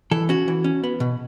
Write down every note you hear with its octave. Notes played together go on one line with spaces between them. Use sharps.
E3 A4
C#4 F#4
E3
C#4
B3
B2